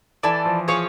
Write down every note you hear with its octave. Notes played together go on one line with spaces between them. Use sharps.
E3 E4 A4 D5
F3
F3 G#4 C#5 F5